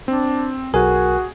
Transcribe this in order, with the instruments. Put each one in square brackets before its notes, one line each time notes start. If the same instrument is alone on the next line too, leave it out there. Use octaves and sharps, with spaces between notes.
[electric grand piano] C4 [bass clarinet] D4
[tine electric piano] B1 A#4 G#5 [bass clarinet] F#4 [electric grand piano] G#4